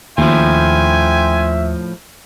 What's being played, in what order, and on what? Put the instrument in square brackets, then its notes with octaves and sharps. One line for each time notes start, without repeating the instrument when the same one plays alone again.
[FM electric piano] D#2 [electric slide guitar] A2 F3 [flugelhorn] E5 [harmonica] G5 G#5 C6